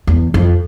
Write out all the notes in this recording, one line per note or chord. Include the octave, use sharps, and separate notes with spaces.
E2
F2